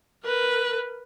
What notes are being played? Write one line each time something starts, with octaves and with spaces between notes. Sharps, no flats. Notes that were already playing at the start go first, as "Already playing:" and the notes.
A#4 B4